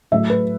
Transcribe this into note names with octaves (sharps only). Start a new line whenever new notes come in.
A2 F#3 A3 E5
B4